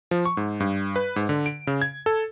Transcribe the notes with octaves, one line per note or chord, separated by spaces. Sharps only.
F3
C#6
G#2
G2
B4
G#2
D3
D7
C#3
G#6
A4